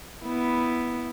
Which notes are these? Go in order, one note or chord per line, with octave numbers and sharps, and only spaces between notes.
B3 E4